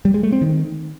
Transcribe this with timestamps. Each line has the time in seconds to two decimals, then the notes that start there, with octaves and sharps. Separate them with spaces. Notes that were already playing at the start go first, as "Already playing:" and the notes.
0.05 G3
0.14 G#3
0.23 A3
0.32 C4
0.42 D#3